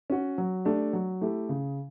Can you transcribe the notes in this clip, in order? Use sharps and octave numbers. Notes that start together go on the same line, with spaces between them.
C#4 F#4
F#3
A3 D4 G4 D5
F#3
A3 E4 G4
C#3